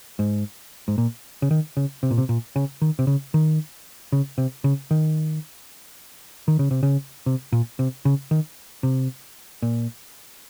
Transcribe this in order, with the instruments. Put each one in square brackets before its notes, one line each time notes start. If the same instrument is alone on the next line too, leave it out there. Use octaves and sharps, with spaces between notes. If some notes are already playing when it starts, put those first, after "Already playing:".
[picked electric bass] G#2
G#2
A#2
C#3
D#3
C#3
C3
A#2
C3
A#2
C#3
D#3
C3
C#3
D#3
C#3
C3
C#3
D#3
D#3
C#3
C3
C#3
C3
A#2
C3
C#3
D#3
C3
A#2